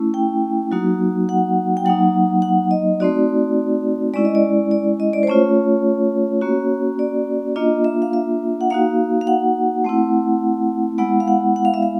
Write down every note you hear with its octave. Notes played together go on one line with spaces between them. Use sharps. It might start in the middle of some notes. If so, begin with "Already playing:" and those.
Already playing: A3 C#4 E4
G5
F#3 A#3 D#4 F#4
F#5
G5
F#3 A#3 D#4 F#5
F#5
D#5
A3 C4 D#4 F#4 D5
G#3 C#4 E4 D5
D#5
D5
D5
D#5
D5
C5
A3 C#4 F4 C#5
A#3 C#4 F#4
D5
A#3 D4 F4 D#5
E5
F5
E5
F#5
A#3 D#4 F#4 F5
F5
F#5
A3 C4 E4
G#3 B3 E4 F#5
F5
F#5
F#5
F5
E5
F5